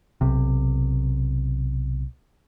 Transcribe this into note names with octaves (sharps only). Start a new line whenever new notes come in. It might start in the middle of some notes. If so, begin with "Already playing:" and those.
B1 C3